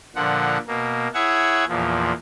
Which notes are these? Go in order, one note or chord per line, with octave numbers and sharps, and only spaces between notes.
A#2 D3 F3 F#5
B2 A#3
E4 G#4 C#5 E5 F#5 G#6
E2 A#2 F3